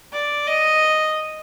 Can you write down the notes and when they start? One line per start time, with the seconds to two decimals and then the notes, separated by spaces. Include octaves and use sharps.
0.13 D5
0.47 D#5